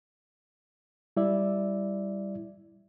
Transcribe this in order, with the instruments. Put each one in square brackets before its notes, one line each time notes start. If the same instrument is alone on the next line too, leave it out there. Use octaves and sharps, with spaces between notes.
[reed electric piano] G3 E4 D5 E5